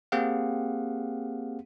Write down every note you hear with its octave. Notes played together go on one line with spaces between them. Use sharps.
A#3 C4 G4 G#4 F5 F#5